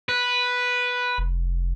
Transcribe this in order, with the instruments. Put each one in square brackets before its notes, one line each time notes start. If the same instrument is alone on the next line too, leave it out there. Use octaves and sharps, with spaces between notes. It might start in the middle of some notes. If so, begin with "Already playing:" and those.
[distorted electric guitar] B4
[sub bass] F1